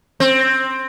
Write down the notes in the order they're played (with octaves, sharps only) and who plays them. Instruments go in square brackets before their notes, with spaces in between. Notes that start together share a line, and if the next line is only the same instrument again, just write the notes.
[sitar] C4